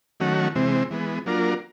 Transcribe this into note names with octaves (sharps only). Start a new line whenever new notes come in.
D#3 F#3 A3 C#4 F#4
C3 E3 G#3 C4
E3 G#3 B3
F#3 A#3 D4 F4 A#4